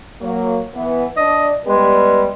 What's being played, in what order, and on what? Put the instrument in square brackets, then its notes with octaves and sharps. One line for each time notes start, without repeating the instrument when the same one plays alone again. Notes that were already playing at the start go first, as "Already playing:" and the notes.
[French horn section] F#3 A#3
E3 B3
[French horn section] D4 D5 [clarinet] D#5
[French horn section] G3 B3 B4 [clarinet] G#3